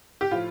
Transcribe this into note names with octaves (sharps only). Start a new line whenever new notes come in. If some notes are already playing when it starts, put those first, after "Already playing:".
G4
A2 F3 F4